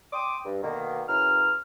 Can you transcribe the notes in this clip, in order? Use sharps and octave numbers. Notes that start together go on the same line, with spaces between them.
G5 C6 D6 D#6
G2
B2 D3 D#3 A#3
F#2 C#3 E4 B4 A#5 F6